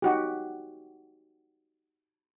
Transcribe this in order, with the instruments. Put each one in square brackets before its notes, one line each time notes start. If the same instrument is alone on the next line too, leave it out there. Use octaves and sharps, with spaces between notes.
[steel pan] D#4 F#4 G4